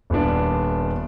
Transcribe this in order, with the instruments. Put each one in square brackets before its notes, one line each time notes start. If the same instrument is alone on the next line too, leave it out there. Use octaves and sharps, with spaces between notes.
[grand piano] D#1 B3 D4